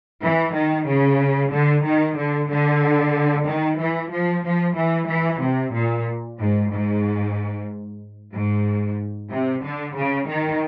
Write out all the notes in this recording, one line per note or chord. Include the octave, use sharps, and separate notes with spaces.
E3
D#3
C#3
D3
D#3
D3
D3
D#3
E3
F3
F3
E3
E3
C3
A#2
G#2
G#2
G#2
C3
D3
C#3
D#3